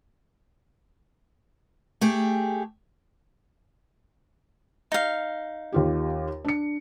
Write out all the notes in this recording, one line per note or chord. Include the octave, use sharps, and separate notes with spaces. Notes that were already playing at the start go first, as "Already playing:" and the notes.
A3 G4 G#4
D#4 F5
D#2 F4 G4
D4 C#7